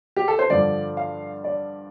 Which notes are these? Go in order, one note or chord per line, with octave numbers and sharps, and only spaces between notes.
G4
A4
C5
G2 D3 F3 D5
F5
D5